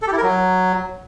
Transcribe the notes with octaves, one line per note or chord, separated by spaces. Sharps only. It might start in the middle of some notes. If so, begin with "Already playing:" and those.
A4
G4
E4
A#4
F#3